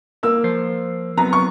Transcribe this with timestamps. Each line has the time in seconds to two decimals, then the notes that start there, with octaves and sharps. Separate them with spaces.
0.23 A#3 E6
0.44 F3 C5
1.18 F#3 B3 C4 A#5
1.33 C#6